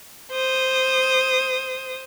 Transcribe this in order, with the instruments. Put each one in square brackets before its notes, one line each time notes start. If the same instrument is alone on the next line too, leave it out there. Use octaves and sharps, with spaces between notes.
[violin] C5 D#6